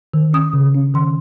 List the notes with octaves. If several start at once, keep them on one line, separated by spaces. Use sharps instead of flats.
D#3
C#4 D#6
C#3
C#4
D#3 C6